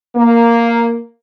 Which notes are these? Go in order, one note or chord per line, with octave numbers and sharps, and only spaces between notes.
A#3